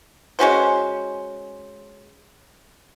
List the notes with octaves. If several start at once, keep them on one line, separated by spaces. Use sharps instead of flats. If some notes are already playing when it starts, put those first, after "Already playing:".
G#3 C#4 F#4 C5